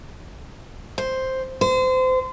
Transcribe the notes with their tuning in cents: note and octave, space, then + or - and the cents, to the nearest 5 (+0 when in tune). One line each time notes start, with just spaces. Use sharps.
C5 +0
C5 -30